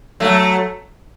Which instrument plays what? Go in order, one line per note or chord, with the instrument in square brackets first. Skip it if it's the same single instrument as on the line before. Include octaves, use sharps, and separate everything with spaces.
[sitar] F#3 A3